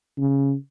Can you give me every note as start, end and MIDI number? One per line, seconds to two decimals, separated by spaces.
0.18 0.54 49